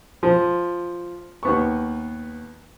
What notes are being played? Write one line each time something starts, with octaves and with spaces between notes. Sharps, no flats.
F3
D#2 B3 C#6